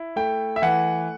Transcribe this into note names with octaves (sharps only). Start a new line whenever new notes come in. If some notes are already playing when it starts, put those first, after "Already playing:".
Already playing: E4
A3 G5
E5
E3 F#5